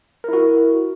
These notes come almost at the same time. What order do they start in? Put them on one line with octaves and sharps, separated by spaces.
A#4 E4 F#4